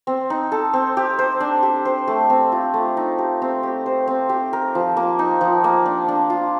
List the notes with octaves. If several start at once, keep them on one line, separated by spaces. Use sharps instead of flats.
C4
D#4
A4
C4
G4
C5
D4
G4
C5
A3
C4
F4
A3
D#4
G4
C4
G4
C5
C4
G4
A#4
F3
A#3
D#4
F3
A#3
D4
D4
F4